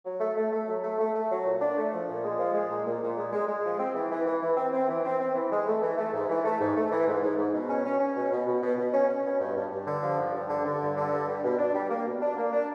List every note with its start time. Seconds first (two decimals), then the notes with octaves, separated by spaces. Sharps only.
0.05 F#3
0.20 A3
0.37 A3
0.53 A3
0.68 F#3
0.83 A3
0.99 A3
1.14 A3
1.30 F#3
1.45 A#2
1.61 D4
1.77 A3
1.92 F3
2.08 A#2
2.24 G#3
2.39 F3
2.54 G#3
2.70 A#2
2.86 A#2
3.01 A#2
3.17 G#3
3.33 G#3
3.48 G#3
3.64 F3
3.79 C4
3.95 E3
4.11 E3
4.26 E3
4.42 E3
4.57 C4
4.73 C4
4.88 E3
5.05 C4
5.20 C4
5.35 E3
5.51 G#3
5.67 A3
5.82 E3
5.97 A3
6.13 G#2
6.29 E3
6.45 A3
6.60 G#2
6.76 A3
6.92 E3
7.07 G#2
7.23 G#2
7.38 G#2
7.54 B2
7.69 C#4
7.85 C#4
8.00 C#4
8.16 B2
8.31 B2
8.47 B2
8.63 B2
8.78 B2
8.94 C#4
9.09 C#4
9.25 B2
9.41 G2
9.57 G2
9.72 G2
9.87 D3
10.03 F3
10.19 G2
10.34 G2
10.49 D3
10.65 D3
10.81 G2
10.97 D3
11.12 G2
11.28 G3
11.44 B2
11.58 D4
11.74 G3
11.90 A#3
12.06 B2
12.22 D4
12.37 A#3
12.53 D4